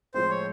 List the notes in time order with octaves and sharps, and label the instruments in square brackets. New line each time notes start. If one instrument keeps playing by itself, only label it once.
[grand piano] A2 F3 G#3 C4 [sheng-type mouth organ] C5
[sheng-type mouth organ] C#5